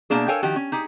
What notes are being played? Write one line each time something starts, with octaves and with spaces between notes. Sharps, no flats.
B2 A3 A#3 D4 G#4
A4 A#4 C#5 F5 G5 G#5
D#3 F3 F#4 G4
C#4
D#4 G4 G#4